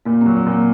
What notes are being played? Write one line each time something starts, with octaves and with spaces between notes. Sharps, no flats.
A#2 A#3
F#3 C4
C4
A#2
A#3